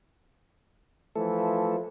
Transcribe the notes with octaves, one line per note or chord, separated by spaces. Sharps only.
E3 F3 A3 A4